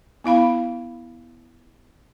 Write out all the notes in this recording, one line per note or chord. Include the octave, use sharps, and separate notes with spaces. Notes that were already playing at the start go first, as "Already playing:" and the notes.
B3 E4 F5 B5